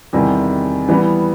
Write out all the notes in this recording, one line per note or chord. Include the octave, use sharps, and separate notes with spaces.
E2 C3 D#3 G3
E3 G3 B3